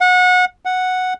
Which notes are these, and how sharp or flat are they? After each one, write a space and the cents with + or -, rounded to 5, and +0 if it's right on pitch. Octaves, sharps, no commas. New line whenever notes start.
F#5 -25
F#5 -5